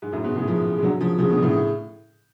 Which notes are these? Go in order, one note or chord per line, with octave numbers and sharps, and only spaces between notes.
G#2
F#2 A2
G#2 B2
A2 C#3
F3 G#3
G#3
D3 F#3
C#3 F3
C#3 F3
B2 D3
A2 C#3